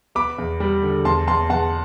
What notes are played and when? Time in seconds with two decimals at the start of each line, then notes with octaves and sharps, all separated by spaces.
0.15 B3 B5 D6
0.38 E2
0.60 G3
0.83 D3
1.05 E2 A5 C6
1.27 E2 A5 C6
1.49 E2 F#5 A5